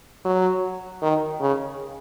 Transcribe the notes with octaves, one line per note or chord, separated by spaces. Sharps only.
F#3
D#3
C#3